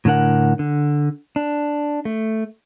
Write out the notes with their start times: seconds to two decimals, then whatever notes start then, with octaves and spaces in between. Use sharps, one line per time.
0.05 A2 D3 D4 A#4 F#5
0.59 D3
1.36 D4
2.05 A3